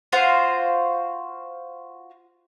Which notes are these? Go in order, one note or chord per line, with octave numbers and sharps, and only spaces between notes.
F4 F#4 C5 F5